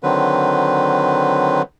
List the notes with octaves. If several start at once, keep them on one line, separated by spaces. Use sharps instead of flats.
D3 D#3 F#3 C4 B4